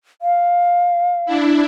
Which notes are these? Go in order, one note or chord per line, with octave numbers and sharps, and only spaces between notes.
F5
D4 E4